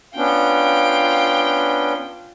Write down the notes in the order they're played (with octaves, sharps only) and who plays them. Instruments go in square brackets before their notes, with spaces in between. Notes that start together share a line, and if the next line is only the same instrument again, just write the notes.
[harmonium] B3 C#4 D4 [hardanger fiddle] F4 G5